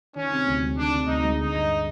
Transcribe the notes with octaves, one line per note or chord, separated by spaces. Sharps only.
D#3 C#4
C3
D2
G#3
D#3 D4
C3
D2 D#4
G#3
D3 D#4
G2